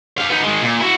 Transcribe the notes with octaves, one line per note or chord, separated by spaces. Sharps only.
G4 F5
B3 D#4
D#3 G#3
A#2
E4 F#4